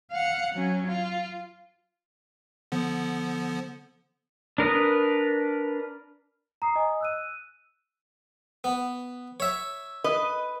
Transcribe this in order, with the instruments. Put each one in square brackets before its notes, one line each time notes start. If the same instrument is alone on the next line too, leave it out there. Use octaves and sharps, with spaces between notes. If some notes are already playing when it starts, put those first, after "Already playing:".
[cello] F5 F#5
F#3 C#4
F4
[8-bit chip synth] D3 F3 B3
[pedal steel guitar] D4 A#4 B4 D#6
[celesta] A#5 D#6 C7
D#5 G#5 D#6
E6 F#6 D#7
[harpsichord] B3
C#5 E5
[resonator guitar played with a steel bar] B4 D#5